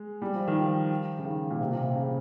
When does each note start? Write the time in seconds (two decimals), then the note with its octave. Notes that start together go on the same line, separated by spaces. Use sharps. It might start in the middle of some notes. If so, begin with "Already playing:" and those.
Already playing: G#3
0.22 G3
0.35 F3
0.48 D#3
0.60 F3
1.19 C#3
1.25 D#3
1.50 A#2
1.61 C3
1.71 A#2
1.83 C3
1.95 C#3